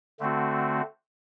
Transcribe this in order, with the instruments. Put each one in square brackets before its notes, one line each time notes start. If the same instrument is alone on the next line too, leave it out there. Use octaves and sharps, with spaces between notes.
[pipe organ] D3 A3 C4 F#4